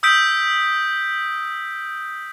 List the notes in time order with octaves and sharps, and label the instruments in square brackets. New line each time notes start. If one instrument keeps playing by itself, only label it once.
[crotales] D#6 E6 G6 B6 D7